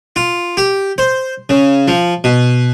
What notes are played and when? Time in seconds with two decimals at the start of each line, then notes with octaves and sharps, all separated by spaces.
0.16 F4
0.57 G4
0.98 C5
1.49 C#3
1.88 F3
2.24 B2